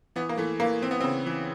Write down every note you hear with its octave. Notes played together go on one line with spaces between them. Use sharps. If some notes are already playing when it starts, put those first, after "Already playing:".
E3 B3
A#3
E3 A3
E3 A#3
E3 C4
B3
C#3 C4
E3